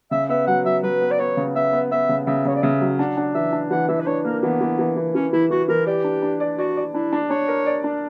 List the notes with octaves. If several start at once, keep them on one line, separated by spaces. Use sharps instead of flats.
C#3 E5
B3 E5
F#3 F#5
F#3 E5
F#3 B4
B3
D5
B3 C#5
C#3
B3 E5
B3
B3 E5
C#3
C#3 E5
C#3 C#5
D5
C#3 E5
F#3
D4 F#5
D4
E3 E5
D4
E3 F#5
E3 E5
B4
D4 C#5
A#3 A#4
E3 B3
E3
E3
E3
E3 C#4
E3 E4
E3 F#4
E3 A#4
G4 D5
D4
D4
D5
F#4 D5
D5
D4 E4
D4
D4 C#5
A#4
D5
D4